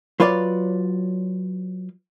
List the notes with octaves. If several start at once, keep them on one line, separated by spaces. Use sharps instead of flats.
F#3 F4 B4 C#5 D5